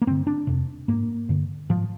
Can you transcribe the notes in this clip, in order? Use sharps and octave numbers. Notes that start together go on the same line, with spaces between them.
A#3
G2 D3 C4
D4
F2 C3
G#2 A#3
G2 D3
G#2 F3